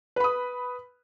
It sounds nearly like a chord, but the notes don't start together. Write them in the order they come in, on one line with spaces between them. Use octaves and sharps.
B4 B5 D#6